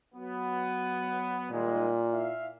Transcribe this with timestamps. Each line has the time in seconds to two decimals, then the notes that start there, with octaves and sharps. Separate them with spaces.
0.15 F#3 B3
1.51 A#2 D#3 G3 G#3
2.12 E4 E5 F5